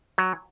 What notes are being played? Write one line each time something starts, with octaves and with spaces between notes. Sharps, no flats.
F#3